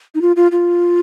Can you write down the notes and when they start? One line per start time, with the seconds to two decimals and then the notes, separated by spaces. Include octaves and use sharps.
0.15 D#4
0.21 F4
0.36 F4
0.52 F4